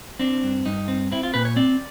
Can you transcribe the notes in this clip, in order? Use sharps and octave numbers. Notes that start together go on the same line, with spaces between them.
C4 D4
G2
G2 D#4
C4
C4 E4
F4
A#2 B4
C#5
C4 D5